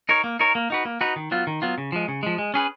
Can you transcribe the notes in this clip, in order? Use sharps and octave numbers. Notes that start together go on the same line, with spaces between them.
D#4 A#4 C#5
A#3
D#4 A#4 C#5
A#3
D#4 F#4 B4
A#3
D#4 F#4 B4
D#3
F#3 B3 F4
D#3
F#3 B3 F4
C#3
F3 G#3
C#3
F3 G#3
G#3
C#4 G#4 B4